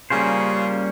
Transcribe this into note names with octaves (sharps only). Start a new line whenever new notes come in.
C#3 G3 A#3 C#4 F4 C5